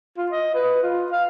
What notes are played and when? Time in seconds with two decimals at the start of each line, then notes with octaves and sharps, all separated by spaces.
0.17 F4
0.32 D#5
0.55 B4
0.83 F4
1.12 F5